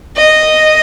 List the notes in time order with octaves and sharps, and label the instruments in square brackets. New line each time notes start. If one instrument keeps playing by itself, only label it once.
[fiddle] D#5